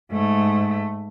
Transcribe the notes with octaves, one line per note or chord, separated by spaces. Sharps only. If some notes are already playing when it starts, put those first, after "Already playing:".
G#2 A3